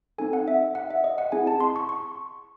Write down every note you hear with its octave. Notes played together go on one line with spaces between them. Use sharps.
C4 D#4 A4 G#5
F#5
E5
F#5
E5
D#5
F#5
C4 E4 G#4 G#5
A5
C6
C#6
C#6